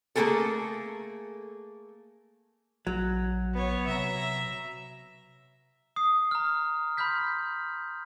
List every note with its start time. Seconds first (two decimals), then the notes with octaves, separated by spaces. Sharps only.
0.15 A3 A#3 E4 F4 G#4 A4
2.87 A#1 F#3
3.53 B3 C#5
3.87 C3 E5 A#5
5.96 D#6 C7
6.31 A#5 F6
6.97 B5 C6 F6 G6 B6